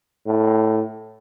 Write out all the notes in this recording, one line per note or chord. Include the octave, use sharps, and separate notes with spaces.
A2